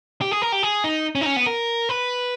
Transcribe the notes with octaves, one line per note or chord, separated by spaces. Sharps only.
G4
G#4
A#4
G4
G#4
D#4
C#4
D#4
C#4
B3
A#4
B4